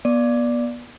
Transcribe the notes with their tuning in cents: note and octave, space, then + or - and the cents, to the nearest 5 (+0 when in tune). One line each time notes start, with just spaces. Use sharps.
B3 -30 D5 +0